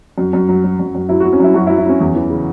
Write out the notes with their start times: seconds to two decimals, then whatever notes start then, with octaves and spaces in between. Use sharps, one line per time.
0.18 F#2
0.33 F#2
0.49 F#3
0.64 F#3
0.79 F#2
0.95 F#2
1.09 F#3 E4
1.20 F#3 F#4
1.33 C#4
1.40 F#2 E4
1.54 F#2 F#4
1.67 E4
1.69 F#3
1.78 E4
1.86 F#3 C#4
2.00 E2
2.16 E3
2.30 C#3